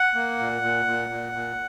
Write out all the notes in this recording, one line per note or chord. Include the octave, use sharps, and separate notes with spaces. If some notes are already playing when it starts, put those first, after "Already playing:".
Already playing: F#5
A#3
A#2
A#2
A#2
A#2
A#2